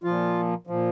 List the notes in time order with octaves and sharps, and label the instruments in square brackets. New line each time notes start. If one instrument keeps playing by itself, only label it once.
[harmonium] A#2 F3 F4
A#2 F3